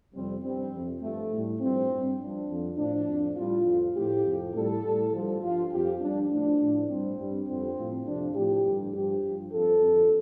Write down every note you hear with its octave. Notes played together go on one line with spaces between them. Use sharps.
F2 C3 G3 C4
G2 G3 C4
F2 C3 F3
G2 F3 A3
A2 G3
G2 F3 C4
G2 G3
G2 F3 D4
F2 D3 F3
A2 F3 D4
F2 F3
A2 G3 F4
F2 F3
A2 F3 G4
F2 C3 F3
A2 G3 A4
A2 G3
G2 D3 F3
G2 F3 F4
F2 F3 G4
G2 F3 D4
A2 F3 D4
A2 F3
G2 G3 C4
G2 G3
F2 D3 G3 C4
A2 F3
F2 C3 F3 D4
A2 F3 G4
G2 D3 G3
G2 F3 G4
G2 F3
F2 F3 A4
F2 D3 F3